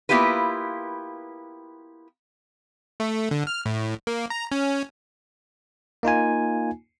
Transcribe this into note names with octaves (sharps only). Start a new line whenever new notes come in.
A#3 B3 E4 F4 G4 B4
A3
D3
F6
A2
A#3
A#5
C#4
A#3 D#4 F4 G#5